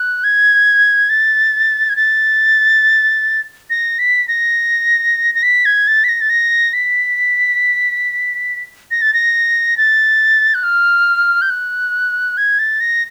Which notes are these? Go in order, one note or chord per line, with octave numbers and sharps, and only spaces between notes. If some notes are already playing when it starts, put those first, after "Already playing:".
Already playing: F#6
G#6
A6
G#6
A6
A#6
B6
A#6
A#6
B6
G#6
A6
B6
A#6
A6
A#6
B6
A#6
A6
A#6
A6
F#6
F6
G6
F#6
G#6
A6
A#6